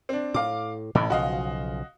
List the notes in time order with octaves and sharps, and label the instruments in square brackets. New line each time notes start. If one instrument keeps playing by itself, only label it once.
[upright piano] C4 D4
[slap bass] A2 [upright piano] F5 D6
[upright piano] A1 [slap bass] A2 C3 E3
[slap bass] B1 C#3 F3 [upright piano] F#4 D#5 F5